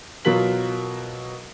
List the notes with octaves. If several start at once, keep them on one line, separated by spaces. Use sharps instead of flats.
B2 F#3 F4 A#4 B6 F#7